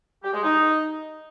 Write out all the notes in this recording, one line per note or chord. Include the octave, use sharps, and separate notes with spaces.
G4
G#3
D#4